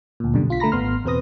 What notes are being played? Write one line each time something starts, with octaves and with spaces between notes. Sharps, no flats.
D2 A#2
F#2 B2 D3 G3
B1 F4 B6
D3 A3 A#5 B5 A#6
G#1 B3 C6 F6
E2 B2 C4 B4 D#6 A#6